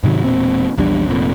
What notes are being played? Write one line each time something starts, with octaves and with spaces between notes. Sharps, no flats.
G#2 C3 D#3 F#3
E1 A#2 C4
A#1 E2 G3 D4
F1 F2 A#2